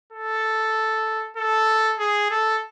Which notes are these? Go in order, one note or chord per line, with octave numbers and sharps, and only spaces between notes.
A4
A4
G#4
A4